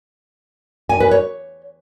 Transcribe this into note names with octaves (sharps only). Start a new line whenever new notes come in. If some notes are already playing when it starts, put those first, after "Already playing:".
G#5
B4
C#5